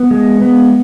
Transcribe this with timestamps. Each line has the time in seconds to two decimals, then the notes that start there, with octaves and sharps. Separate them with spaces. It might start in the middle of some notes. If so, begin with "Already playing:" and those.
Already playing: B3
0.11 G#3
0.41 B3